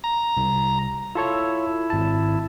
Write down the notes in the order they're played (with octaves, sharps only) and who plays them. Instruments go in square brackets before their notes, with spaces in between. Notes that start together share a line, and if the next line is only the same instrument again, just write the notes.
[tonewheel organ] A#5
[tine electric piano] C2
[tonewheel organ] E4 [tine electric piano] F4 A4 C#5
[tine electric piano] G#1 A5